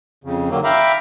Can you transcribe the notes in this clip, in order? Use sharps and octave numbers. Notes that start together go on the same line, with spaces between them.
F2 C#3
D3 D#3 F#3 A#3
E5 F5 G5 A#5 B5 D6